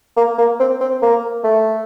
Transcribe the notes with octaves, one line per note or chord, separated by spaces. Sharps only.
A#3
A#3
C4
C4
A#3
A3